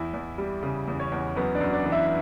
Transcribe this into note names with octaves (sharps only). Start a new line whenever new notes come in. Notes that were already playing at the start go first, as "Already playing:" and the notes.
Already playing: E2 E4 E5
E2
G3
C#3
E2
C#4 C#5
E2
F#2 B3 B4
D4 D5
F#2
D4 D5
E3
E4 E5